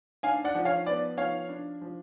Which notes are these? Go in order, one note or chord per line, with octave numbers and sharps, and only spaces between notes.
D4 F5 G#5
D5 F#5
F3
C#5 F5
B3 D5
F3 C#5 F5
D4
F3